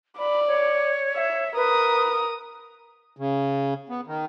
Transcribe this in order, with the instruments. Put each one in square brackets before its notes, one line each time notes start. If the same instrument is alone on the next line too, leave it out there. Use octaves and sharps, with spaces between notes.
[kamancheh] D5 [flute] B5
[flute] C#5
[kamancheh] E5
[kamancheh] A#4 D#6 [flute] B4
[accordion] C#3
B3
D#3